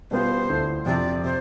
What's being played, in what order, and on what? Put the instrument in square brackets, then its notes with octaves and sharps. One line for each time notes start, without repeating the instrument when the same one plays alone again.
[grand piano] B2 G3 B3 F4 B4 [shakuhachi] C5
[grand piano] D2 D3 A3 E4
[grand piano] F2 C3 F3 [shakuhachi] D5
[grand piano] C3 [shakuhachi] C5